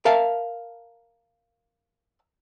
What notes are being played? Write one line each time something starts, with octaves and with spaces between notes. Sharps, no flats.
A#4 E5 F5 A5